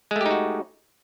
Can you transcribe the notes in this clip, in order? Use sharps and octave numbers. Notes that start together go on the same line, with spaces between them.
G#3 A3 D#4 F#4 G4